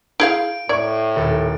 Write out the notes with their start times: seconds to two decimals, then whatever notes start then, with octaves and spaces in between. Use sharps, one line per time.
0.20 E4 G#4 F5 G6 D7
0.69 A2 D5 C#6 G#6
1.16 D#1 A4